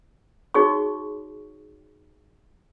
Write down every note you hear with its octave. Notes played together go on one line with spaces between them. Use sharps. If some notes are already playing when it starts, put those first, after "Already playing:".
D#4 F#4 G#4 C#5 C#6